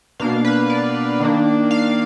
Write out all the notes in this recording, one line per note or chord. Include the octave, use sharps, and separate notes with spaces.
B2 A#3 D4 F5
B4
D5
D#3 A#3 D4
F5